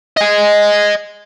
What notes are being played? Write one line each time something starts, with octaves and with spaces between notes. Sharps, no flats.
D#5 G#5